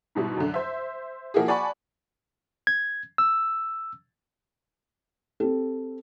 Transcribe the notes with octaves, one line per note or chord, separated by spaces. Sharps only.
G#2 B2 G3 E4
F#2 D3
C5 E5
F3 A#3 E4 F#4 G#4
D5 F#5 G#5 A5 B5 C#6
G#6
E6
C4 G4 A4